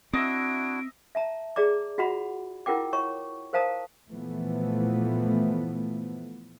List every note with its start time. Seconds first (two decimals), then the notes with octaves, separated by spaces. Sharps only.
0.13 C4 D4 E4 F#4 D#5 E5 D7
1.15 E5 A5 A#5
1.56 G#4 D5 A#5 D6
1.98 F4 F#4 F#5 A#5 B5
2.66 E4 F4 A#4 F#5 G5 D6
2.93 C#5 A#5 C#6
3.53 A#4 C5 F5 A5 A#5 D#6
4.12 A#2 E3 F3 A3 B3